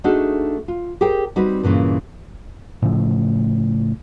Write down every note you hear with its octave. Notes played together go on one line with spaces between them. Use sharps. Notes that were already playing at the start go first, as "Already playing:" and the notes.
A3 D4 D#4 F#4 G#4 A4
F4
G4 G#4 A#4 C5 G5
G3 C4 D#4 F#4 B4
G2 A#2 C#3 E3
A2 C#3 F3 A3